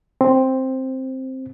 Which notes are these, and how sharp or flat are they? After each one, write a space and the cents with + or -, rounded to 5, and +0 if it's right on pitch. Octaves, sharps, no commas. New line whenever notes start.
C4 +5